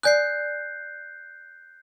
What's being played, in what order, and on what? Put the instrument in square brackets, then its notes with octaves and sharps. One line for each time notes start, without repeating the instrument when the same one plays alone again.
[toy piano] D5 G#5 D#6 [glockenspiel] F#6 G6 C7